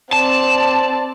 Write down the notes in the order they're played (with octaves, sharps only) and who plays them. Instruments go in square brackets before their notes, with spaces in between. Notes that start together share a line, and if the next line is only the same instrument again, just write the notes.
[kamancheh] C4 D5 [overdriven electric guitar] A5